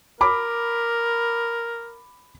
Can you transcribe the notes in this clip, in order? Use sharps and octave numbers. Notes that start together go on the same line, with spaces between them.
A#4 B5 D6